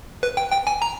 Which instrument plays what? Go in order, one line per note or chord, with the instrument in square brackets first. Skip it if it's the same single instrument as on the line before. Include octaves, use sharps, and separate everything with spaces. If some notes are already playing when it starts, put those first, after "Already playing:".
[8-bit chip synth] B4
G5
G5
G#5
A#5